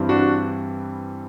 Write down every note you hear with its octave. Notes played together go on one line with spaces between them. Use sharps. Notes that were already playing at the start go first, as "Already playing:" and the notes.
Already playing: G2 E3 G3 C4
D4 F#4